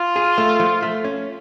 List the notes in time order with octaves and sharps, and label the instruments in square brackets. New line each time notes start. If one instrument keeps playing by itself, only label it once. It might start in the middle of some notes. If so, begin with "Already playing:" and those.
Already playing: [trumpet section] F4
[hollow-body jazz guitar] G#4
A3
F3
A3
C#4